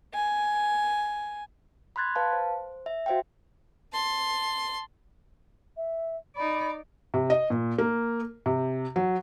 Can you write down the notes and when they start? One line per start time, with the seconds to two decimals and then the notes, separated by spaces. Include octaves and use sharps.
0.14 G#5
1.96 B5 C6 F#6 G#6 A6
2.15 B4 F5 A5
2.33 C5
2.86 E5
3.06 F#4 C5 E5 F5 G5
3.93 A5 C6
5.77 E5
6.36 D#4 D5 B5
7.14 C3
7.30 D#5
7.50 A#2
7.78 A#3
8.46 C3
8.96 F#3